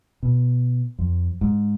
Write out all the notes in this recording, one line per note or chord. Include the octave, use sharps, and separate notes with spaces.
B2
F2
G#2